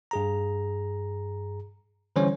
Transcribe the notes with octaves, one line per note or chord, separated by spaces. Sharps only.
G2 G#4 A#5
D3 E3 G3 C#4 C5 C#5